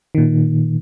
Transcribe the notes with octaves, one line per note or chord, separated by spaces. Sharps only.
A#2 D#3